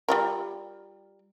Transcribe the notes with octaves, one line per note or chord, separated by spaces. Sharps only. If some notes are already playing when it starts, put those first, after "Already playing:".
G3 F4 A#4